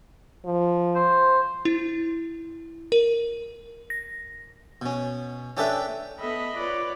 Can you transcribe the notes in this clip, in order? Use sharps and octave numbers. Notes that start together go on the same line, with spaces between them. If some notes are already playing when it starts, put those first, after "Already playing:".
F3
C5
E4
A#4
A#6
B2 C#4
C#4 D4 G4 A4 B4 E5
B3 A4 D#5 E5 B5
F4 B4 C#5 D5